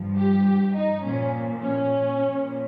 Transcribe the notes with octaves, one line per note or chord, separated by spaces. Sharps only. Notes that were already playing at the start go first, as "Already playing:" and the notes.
Already playing: G2 F3
G4
D#4
A#2 F3 C#4
C#4
A#2 F3